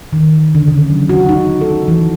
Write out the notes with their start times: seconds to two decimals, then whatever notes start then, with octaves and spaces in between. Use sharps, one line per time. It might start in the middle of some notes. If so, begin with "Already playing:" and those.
0.13 D#3
0.55 D3
0.68 C#3
0.90 F#3
1.09 F#4
1.29 D#4
1.61 A4
1.88 E3